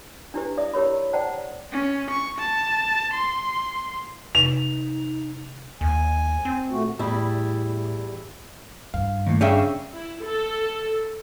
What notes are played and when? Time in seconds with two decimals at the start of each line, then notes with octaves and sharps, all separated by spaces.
0.34 D4 E4 G4 B4
0.58 D5 E5 D#6
0.74 E4 G4 A#4 C#5 B5
1.13 C5 D5 F#5 G5 A5 A#5
1.72 C#4
2.11 C#6
2.39 A5
3.14 C6
4.35 C3 D#4 F7
5.81 D#2 G#5
6.45 C4
6.70 A#2 A3 F#4
6.99 E2 A2 G3 E4
8.94 G2 F5
9.27 D#2 A2
9.41 C#3 C#4 D4 G#4 E5 F5 G5
9.93 E4
10.24 A4